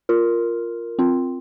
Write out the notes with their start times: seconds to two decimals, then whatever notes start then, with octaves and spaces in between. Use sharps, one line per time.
0.09 F4 A#4
0.99 C4 F4